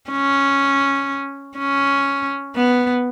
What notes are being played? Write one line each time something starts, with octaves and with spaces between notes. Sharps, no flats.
C#4
C#4
B3